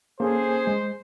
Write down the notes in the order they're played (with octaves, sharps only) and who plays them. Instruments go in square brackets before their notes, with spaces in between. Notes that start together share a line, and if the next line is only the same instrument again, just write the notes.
[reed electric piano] A#3 C#4 A4 [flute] G#4 [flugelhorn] C5
[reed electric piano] G#3